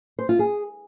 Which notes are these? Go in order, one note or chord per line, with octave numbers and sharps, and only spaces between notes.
C5
F4
G#4